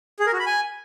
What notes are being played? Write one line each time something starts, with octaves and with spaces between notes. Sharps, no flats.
G#4
A#4
F#4
B5
G#5